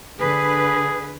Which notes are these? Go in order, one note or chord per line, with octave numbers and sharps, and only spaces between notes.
D3 G#4 B4